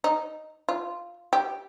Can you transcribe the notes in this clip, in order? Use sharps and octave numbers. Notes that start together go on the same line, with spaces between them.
D#4
F4
G4